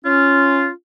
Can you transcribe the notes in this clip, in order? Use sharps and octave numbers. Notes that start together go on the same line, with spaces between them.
C#4 F4